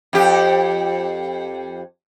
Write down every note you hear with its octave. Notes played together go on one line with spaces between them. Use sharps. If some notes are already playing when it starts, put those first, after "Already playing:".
F2 G4